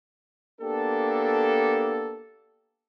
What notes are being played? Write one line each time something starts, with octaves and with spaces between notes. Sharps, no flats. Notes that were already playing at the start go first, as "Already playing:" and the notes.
A#3 B3 D4 G4 A4